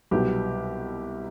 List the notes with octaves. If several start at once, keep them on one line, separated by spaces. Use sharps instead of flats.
C2 B2 F#3 B3 G4